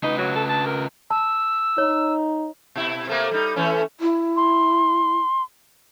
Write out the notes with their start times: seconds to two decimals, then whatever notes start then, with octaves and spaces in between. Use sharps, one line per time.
0.03 C#3 D#4 B4
0.18 F#3
0.36 A4
0.49 A5
0.66 A#4
1.10 A5 E6
1.78 D#4 C#5
2.76 B2 E4
3.07 C3 A3 A#3
3.31 G3 D#4
3.56 E3 A3 C#4
4.00 E4
4.36 C6